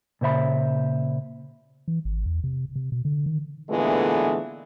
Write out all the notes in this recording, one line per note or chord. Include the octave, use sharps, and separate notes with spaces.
A#2 C#3 C5 E5 B5
E3
G#1
E2
C3
C3
B2
D3
D#3
A#2 D3 E3 G#3 A3 B3